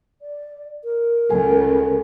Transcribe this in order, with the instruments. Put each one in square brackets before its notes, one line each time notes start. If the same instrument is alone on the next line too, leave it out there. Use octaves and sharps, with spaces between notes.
[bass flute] D5
A#4
[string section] C#2 [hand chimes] A4 G#5